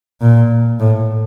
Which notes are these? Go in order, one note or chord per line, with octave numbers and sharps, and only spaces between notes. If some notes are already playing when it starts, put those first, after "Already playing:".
A#2
A2